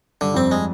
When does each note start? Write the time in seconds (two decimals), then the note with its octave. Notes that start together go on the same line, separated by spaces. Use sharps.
0.21 G2 D3
0.34 F2 C4
0.51 G#3